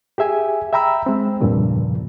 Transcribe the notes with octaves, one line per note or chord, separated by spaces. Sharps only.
G4 G#4 E5 G#5
E5 G5 A#5 B5 E6
G#3 C4
E2 G2 A#2 C#3 F3